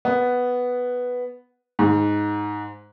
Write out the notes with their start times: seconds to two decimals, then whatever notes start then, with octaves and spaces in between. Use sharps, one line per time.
0.05 B3
1.79 G#2